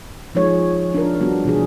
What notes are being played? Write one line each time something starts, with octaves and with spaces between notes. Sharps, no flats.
F3 G#3 D#4 G#4 C#5
D4 F4 A#4
G3 B3 D4 F#4
B2 E3 D4 G#4